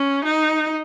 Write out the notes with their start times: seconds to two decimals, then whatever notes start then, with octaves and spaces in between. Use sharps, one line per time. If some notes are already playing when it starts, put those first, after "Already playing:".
Already playing: C#4
0.25 D#4